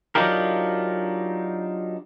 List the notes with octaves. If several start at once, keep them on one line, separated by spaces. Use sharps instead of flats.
F#3 D4 D#4 F4 G4 A#4